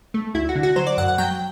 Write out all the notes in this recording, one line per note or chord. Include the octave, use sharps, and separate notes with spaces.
A3
D2 E4
F#4
D3
F#4
F#3 C5
D5
F#2 F#5
F#5
F#3 G5